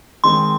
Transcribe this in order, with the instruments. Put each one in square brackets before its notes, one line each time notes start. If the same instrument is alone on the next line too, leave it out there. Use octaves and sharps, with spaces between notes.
[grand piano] D#3 G#3 C4 [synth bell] C6